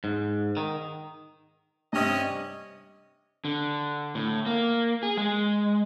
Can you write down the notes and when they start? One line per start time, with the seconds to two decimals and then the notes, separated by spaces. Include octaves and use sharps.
0.04 G#2
0.57 D#3
1.93 G2 C3 C#4 D#5
3.45 D3
4.15 A2
4.46 A#3
5.03 G#4
5.17 G#3